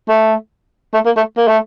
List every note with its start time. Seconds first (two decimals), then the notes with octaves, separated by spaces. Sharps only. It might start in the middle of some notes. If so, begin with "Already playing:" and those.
0.08 A3
0.94 A3
1.05 A#3
1.16 A3
1.37 A#3
1.48 A3